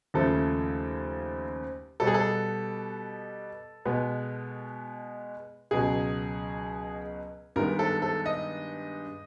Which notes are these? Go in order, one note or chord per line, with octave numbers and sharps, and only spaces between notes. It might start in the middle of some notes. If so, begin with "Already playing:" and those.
D#2 C#3 F3 A3 A4
B2 G3 B3 A4
G#4
A4
B2 G#3 B3
C#2 B2 F#3 G#4
G2 D#3 G#3 B3 A#4
A4
A4
D#5